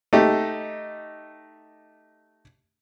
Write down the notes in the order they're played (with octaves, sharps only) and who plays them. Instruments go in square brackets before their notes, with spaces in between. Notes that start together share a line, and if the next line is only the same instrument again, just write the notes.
[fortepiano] A3 D#4 G4